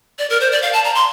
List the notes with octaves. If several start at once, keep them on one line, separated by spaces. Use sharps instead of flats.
D5
A#4
C5
D5
F5
A5
A#5
C6